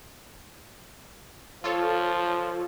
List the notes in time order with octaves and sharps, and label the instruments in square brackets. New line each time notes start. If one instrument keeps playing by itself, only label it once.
[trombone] F3 [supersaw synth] F4 A4 C#5